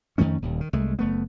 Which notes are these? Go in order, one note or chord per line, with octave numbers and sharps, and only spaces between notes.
F2 D#3 A3 C#4
D#1 D#2
D#3
C2 G#3 A3
F#1 A3 B3